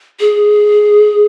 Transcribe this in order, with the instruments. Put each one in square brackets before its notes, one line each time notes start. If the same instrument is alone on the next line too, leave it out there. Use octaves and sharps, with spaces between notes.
[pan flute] G#4